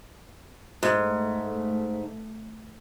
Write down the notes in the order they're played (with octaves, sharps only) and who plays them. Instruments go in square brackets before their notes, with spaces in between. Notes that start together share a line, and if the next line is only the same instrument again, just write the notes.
[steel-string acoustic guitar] G#2 [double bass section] A3